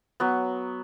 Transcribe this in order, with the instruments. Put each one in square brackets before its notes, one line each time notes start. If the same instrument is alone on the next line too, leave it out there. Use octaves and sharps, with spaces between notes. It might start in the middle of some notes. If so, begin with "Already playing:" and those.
[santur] F#3 B3